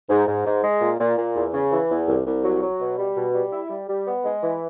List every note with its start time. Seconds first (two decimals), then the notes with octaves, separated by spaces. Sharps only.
0.09 G#2
0.27 G#2
0.45 G#2
0.63 G#3
0.81 A#2
0.99 A#2
1.17 A#2
1.35 E2
1.53 C#3
1.71 E3
1.89 E2
2.08 C2
2.25 C2
2.44 F#3
2.62 F#3
2.79 B2
2.97 G3
3.16 B2
3.33 G3
3.52 E4
3.70 G3
3.88 G3
4.06 B3
4.24 G#3
4.43 E3